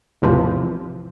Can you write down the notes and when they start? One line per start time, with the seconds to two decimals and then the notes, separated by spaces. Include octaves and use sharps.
0.22 A1 E2 C3 E3 F3